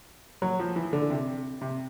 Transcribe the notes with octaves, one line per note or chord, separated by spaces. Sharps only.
F#3
F3
E3
D3
C3
C3